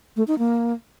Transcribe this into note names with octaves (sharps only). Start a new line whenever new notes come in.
A3
D#4
A#3